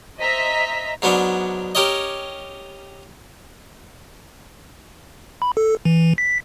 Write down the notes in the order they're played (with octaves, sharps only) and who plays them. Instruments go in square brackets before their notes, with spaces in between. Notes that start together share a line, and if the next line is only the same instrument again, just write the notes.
[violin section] C5 D#5 E5 A#5 B6
[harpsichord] G#2 F#3 B3 C#4 D4
C#4 G4 A#4 C#5 D#5
[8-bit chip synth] B5
A4
E3
B6